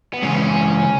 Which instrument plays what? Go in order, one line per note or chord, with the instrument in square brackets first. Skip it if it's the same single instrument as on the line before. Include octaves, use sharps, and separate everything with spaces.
[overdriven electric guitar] B3
[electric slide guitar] C#3 E3 G#3 [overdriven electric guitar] C#4